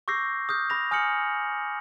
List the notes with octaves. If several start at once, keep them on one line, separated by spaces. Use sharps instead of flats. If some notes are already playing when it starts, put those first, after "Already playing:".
C#6 D6 E6 G6 A#6 C7
D#6 F6 G6
B5 G6 A#6 F7
G#5 D#6 F6 G6 C#7 F#7